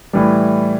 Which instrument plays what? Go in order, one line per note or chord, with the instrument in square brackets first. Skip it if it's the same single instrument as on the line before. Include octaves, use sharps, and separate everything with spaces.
[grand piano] A2 E3 G3